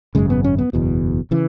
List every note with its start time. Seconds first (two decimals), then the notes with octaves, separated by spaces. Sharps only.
0.15 G#1 F#2 C#3 G#3
0.30 B3
0.44 C#4
0.58 B3
0.73 F#1 E2 B2
1.31 C#3 E3